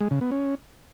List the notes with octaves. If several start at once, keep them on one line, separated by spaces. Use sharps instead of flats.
G#3
C#3
B3
C#4